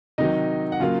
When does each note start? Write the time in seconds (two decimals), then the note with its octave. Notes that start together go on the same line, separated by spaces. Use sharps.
0.18 C3 D#3 F#3 D#4 D#5
0.72 F#5
0.80 C#3 F#3 A#3 F4 F5